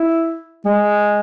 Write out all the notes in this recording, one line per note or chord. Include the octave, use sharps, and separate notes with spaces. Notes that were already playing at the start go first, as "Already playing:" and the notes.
Already playing: E4
G#3